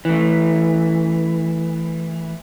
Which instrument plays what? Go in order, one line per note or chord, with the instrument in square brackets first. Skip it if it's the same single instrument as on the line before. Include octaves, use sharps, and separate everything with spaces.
[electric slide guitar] E3 A3